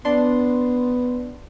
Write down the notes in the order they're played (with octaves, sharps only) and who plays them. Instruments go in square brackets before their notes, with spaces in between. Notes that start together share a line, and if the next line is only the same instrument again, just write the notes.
[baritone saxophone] B3 [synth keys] D4 C6